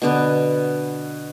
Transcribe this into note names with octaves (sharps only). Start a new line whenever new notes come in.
B2 D3 B3